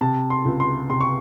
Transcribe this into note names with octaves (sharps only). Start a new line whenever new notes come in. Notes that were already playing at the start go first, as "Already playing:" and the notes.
C3 A5
C6
C#2
C6
C3 C6
C#6